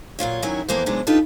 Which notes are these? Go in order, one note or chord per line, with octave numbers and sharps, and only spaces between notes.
A#2 F#3 F4 C#5
D#3 F#3 C#4 E4 C#5
F2 E3 A#3 B3 C5
C3 E3 F#3 G#3 B3 D4
D4 D#4 F4 G4 A4 B4